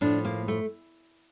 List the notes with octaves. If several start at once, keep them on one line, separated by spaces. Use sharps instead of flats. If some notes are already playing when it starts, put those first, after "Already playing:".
A2 F3 D4
A#3
A3